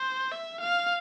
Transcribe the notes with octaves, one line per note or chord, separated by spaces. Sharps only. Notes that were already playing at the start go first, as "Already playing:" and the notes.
Already playing: C5
E5
F5